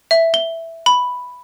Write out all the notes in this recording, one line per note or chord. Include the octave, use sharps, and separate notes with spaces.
E5
G7
B5